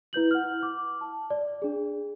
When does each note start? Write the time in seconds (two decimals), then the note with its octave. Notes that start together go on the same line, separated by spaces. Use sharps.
0.13 E4 B4 G6 F#7
0.31 F#5 F6
0.63 D6
1.01 A5
1.30 D5
1.62 D4 G#4